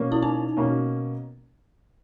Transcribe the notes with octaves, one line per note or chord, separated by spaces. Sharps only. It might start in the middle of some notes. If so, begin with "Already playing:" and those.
Already playing: B2 A#3 C#4
E4
D#4
B2 A#3 C#4